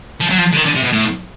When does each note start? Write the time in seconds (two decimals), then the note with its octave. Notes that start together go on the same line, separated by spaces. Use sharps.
0.20 F3
0.30 F#3
0.38 F3
0.52 D3
0.56 D#3
0.65 D3
0.75 C3
0.84 B2
0.92 A2